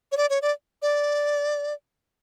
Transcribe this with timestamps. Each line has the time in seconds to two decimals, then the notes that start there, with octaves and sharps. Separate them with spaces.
0.12 C#5
0.17 D5
0.30 C#5
0.42 D5
0.82 D5